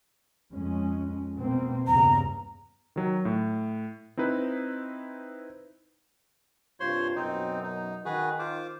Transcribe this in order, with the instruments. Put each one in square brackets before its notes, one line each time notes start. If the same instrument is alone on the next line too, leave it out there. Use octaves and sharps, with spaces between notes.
[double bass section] F2 G#3 C#4
B2 A#3 C4
[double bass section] E2 G2 C#3 [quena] A#5
[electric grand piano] D#3 F#3
A2
C4 D#4 E4 B4
[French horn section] G2 C3 F4 [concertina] C5 C#5 C6
[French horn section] F#2 B2 [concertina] C4 D#4
[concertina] D#4
[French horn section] D#3 [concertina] F#4 G#4 B4
[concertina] F4 C5 D6